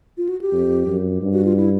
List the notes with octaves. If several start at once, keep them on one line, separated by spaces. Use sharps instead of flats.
F4
F#4
G4
F2
F#2
G2
F#4
F4
E4